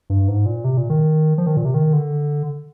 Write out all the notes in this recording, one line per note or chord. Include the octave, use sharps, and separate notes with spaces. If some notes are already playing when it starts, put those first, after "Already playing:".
G2
G#2
A#2
C3
A#2
D#3
F3
D#3
A#2
C3
D#3
D3